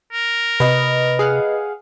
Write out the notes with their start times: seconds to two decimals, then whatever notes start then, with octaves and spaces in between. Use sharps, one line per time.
0.13 A#4
0.60 C3 B4 D#5
1.19 G#4 F5 F#5